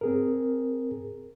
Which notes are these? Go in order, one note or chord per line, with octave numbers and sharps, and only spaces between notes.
C4 G#4 A#4